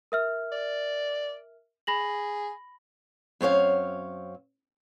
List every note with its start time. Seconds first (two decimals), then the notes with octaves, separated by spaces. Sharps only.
0.12 A#4 E5 F6
0.52 D5
1.87 G#4 B5 A#6 F#7
3.41 F#2 C4 C#5 F5